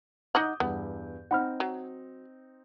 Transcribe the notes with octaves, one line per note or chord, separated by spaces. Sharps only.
D#4 D#5 F#5 D6 D#6 G6
E2 G2 B3
C4 D#4 F#5 B5 F6
F#3